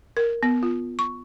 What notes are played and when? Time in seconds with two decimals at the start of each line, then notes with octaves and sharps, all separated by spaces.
0.17 A#4
0.43 B3
0.63 F4
0.99 C#6